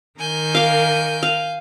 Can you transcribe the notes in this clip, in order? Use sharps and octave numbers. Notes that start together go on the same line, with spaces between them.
D#3 A#4 G#5 G6
F5 D6
F5